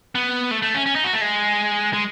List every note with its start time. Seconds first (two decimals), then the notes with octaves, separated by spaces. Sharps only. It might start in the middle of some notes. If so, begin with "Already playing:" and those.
0.15 B3
0.51 A3
0.62 A3
0.74 C#4
0.86 C#4
0.95 D#4
1.04 F#4
1.13 A3
1.21 G#3
1.93 G#3